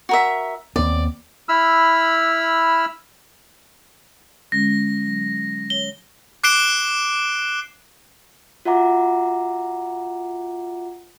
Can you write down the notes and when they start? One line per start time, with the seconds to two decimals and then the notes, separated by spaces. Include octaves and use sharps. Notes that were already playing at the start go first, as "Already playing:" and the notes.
0.09 F#4 A#4 E5
0.76 D#2 B3 C4 D5
1.49 E4 B5 E6 F6
4.52 D3 G#3 C#4 A#6
5.05 F#3
5.70 C#5 G7
6.44 D6 F#6 C7 D7 E7 G7
8.65 F4 F#4 E5 F#5 A#5 D6